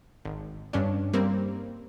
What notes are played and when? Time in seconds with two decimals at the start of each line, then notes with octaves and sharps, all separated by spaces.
0.25 G#1
0.73 G2 C#4 D4
1.13 G3 A#3 C4